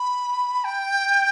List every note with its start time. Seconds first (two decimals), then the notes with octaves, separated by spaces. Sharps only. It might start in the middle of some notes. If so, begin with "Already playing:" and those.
Already playing: B5
0.64 G5